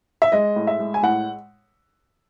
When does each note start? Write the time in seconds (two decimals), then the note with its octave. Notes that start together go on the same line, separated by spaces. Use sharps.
0.22 E5
0.32 G#3 D#5
0.56 A2
0.67 E5
0.79 G#3
0.94 G#5
1.03 A2 F#5